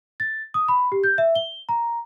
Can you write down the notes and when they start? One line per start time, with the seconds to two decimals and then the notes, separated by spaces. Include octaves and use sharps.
0.20 A6
0.54 D#6
0.68 B5
0.92 G4
1.04 G6
1.18 E5
1.35 G7
1.69 A#5